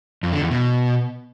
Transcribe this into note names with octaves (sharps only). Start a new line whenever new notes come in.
F2
D3
E2
B2